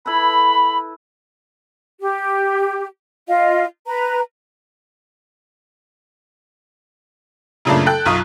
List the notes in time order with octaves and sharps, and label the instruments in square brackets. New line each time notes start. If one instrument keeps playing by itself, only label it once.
[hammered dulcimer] E4 A4 B4 [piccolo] B5
[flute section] G4
F4 D#5 F5
B4 A#5
[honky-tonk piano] F#2 A#2 C#3 A3 A#3 D4
A4 G5 F#6
B1 F#2 F4 C#6 D#6